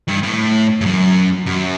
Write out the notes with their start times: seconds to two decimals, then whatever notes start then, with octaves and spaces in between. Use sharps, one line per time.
0.08 G2
0.23 A2
0.81 G2
0.86 F#2
1.46 F#2